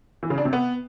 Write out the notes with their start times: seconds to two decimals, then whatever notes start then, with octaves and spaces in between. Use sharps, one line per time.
0.23 E3
0.30 C#3
0.38 D4
0.45 C3
0.53 B3